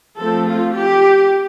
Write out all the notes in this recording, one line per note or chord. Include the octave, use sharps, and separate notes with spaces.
F3 A3 C4 A4
F4
G4